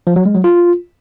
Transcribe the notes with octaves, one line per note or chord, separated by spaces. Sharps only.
F3
F#3
G#3
F#3
F4